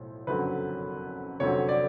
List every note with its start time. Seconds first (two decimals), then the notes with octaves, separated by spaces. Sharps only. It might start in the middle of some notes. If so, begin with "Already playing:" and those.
Already playing: B1 A2 F3
0.27 F#1 F2 D3 F#3 B4
1.40 F1 F2 D3 F#3 C#5
1.69 D5